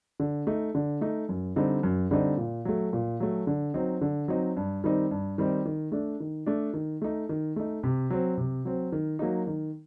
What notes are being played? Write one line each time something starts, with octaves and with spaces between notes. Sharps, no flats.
D3
A3 D#4
D3
A3 D#4
F#2
D3 G3 C4 D#4
F#2
D3 G3 C4 D#4
A#2
F#3 A3
A#2
F#3 A3
D3
F#3 C4 D#4
D3
F#3 C4 D#4
G2
D#3 G3 C4 D#4
G2
D#3 G3 C4 D#4
D#3
A3 D4
D#3
A3 D4
D#3
A3 D#4
D#3
A3 D#4
C3
F#3 C4
C3
F#3 C4
D#3
F#3 A#3 D#4
D#3